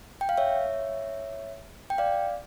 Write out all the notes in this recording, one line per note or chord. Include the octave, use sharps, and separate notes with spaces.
G5
F5
C#5 E5
G5
D5 F5